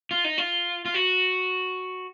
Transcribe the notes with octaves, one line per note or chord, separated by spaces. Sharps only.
F4
D#4
F4
F4
F#4